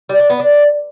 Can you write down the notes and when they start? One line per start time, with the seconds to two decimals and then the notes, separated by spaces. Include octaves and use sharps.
0.09 G3
0.20 D4
0.30 B3
0.40 D4